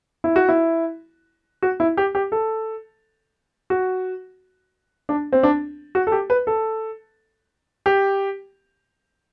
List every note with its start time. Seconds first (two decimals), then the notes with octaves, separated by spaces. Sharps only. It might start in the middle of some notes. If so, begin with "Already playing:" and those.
0.24 E4
0.36 F#4
0.49 E4
1.63 F#4
1.80 E4
1.97 G4
2.15 G4
2.32 A4
3.70 F#4
5.09 D4
5.32 C4
5.43 D4
5.95 F#4
6.07 A4
6.12 G4
6.30 B4
6.47 A4
7.86 G4